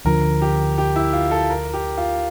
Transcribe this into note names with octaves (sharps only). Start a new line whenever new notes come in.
D2 D3 F3 A#4
G4
G4
E4
F4
A4
A#4
G4
F4